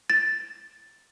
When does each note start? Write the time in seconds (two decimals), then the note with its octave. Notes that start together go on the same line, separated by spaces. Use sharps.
0.10 A6